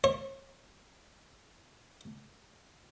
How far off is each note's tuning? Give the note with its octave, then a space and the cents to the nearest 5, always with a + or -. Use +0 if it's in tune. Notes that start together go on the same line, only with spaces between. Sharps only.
C#5 -40